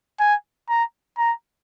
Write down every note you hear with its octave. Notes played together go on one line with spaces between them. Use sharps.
G#5
A#5
A#5